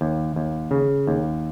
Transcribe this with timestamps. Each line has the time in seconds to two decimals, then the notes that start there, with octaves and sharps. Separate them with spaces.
0.01 D#2
0.36 D#2
0.71 C#3
1.07 D#2